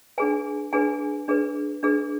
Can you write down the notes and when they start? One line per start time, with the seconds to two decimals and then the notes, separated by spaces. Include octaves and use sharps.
0.18 D4 G#4 B4 G#5
0.73 D4 G#4 B4 G#5
1.28 D4 G#4 B4
1.83 D4 G#4 B4